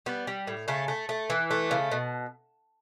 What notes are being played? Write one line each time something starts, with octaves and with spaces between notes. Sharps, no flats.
G3 B3
G3
A2
C#3 A3
A3
A3
E3
A3
C#3
B2